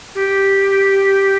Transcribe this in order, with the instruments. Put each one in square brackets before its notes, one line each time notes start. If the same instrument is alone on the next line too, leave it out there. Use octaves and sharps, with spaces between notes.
[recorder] G4